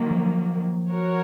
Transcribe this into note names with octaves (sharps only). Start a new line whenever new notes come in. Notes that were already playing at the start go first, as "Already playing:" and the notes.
Already playing: D#3 F#3 A#3
F3
F#4 A#4 C#5